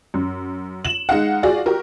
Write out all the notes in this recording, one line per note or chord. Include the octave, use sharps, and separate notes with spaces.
F#2
E7 F#7
G#3 D#4 F5 F#5
F4 F#4 G#4 D5 F5
F#4 G4 A#4